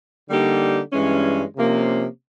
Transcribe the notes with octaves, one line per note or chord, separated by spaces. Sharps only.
D3 G3 A#3 D#4 G4
G2 E3 G#3 C#4
C3 F3 A#3 C#4